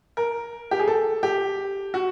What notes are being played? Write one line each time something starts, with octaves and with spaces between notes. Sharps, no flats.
A#4
G4
G#4
A4
G4
F#4